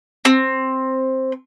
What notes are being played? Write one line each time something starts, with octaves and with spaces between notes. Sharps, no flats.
C4